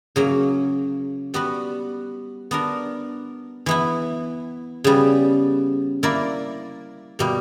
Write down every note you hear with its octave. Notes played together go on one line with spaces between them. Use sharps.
C#3 F#3 A#3
G3 B3 F#4 B4
B3 D4 A#4
E3 B3 E4
C#3 G3 B3
A#3 E4 A#4 D5
B2 G3 A#3